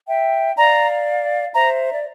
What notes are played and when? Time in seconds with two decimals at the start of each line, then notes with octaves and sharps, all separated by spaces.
0.08 E5 G5
0.57 D5 F5 A#5
1.55 C5 E5 A#5
1.95 D5